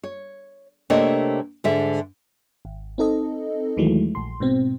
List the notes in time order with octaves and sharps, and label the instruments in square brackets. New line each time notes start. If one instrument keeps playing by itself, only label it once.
[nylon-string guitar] C#5
C3 A3 A#3 D4 C#5 D#5
G#2 D3 E5
[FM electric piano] G#1
C4 D#4 A4 D#5
D#2 D#3 E3 F#3 G#3 A3
A#1 C6
G#2 B2 C4